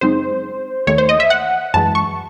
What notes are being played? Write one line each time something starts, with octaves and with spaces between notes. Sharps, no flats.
F#2 C#3 G#3 C4 D#4 C5
D#2 D#3 A3 C#5
C5
D#5
E5
F#5
F#2 E3 G#3 A5
C#6